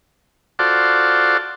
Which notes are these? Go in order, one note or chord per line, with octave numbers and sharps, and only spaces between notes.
F4 F#4 A4 C5 D5